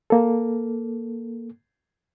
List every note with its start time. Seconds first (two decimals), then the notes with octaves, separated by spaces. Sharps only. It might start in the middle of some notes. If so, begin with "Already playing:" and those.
0.10 A#3 A4